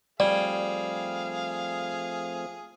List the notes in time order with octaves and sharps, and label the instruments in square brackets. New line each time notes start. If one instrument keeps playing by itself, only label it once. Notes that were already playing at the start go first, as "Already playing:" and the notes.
[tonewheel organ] F3 A3 C4 [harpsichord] G3 [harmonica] G#4 F5 [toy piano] D5